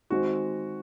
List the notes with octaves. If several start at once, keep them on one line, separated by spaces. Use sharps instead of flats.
D#3 G#3 C4 F#4